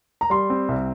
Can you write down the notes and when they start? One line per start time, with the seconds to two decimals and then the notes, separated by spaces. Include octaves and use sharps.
0.21 A#5
0.30 G3 C6
0.50 C4
0.69 C2